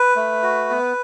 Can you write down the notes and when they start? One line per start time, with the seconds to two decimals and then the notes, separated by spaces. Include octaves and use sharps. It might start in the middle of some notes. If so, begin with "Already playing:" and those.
Already playing: B4
0.16 A3
0.42 F#4
0.70 B3